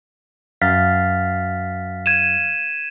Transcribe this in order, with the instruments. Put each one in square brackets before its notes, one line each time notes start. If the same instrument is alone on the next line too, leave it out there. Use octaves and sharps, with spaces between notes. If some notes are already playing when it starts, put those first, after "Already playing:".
[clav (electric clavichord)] F#2 [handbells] F5 F6 A6 [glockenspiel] B6
[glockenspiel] G#6 D#7 E7